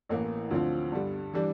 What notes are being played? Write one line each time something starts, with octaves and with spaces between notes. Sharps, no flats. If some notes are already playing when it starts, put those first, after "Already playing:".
A1 A2 E3 A#3
D2 D3 F3 C4 F4
G2 D3 G3
E3 G3 D4